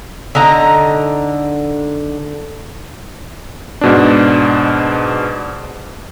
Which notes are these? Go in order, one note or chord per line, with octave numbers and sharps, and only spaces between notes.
D3 D#4 A#5
G#2 B2 D4